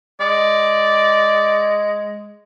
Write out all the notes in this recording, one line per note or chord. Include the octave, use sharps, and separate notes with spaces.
G#3 D5